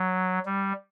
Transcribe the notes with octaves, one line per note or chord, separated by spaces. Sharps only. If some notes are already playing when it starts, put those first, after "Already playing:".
Already playing: F#3
G3